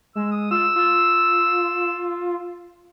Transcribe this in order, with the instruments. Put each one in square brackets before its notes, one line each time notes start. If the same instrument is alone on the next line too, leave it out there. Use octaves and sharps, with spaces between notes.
[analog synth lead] G#3 [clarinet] E6
[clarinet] D#6
[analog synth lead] F4 [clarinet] E6
[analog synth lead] F4